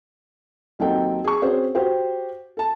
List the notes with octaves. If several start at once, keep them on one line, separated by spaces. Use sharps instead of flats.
D#2 F#3 C4 D#4 A4 G5
G#4 C#6
C4 C#4 F#4 G#4 C5 C#5
F#4 G4 C5
A4 A5